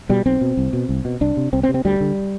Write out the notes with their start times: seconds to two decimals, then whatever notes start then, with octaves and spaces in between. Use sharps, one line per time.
0.09 B2 G3
0.26 B1 C4
0.41 B2
0.57 C2
0.73 B2
0.89 C2
1.05 B2
1.21 C2 D4
1.37 C3
1.53 C2 C4
1.63 C4
1.69 C3
1.74 C4
1.85 D2 G3
2.01 D3